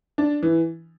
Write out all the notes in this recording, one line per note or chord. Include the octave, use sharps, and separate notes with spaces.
D4
E3